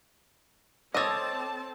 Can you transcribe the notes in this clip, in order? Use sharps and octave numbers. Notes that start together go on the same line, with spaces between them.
C4 A4 C#5 D#5 A5 D6 E6 A6